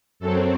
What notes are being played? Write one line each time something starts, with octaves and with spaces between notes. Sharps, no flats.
F#2 F#3 C4 A4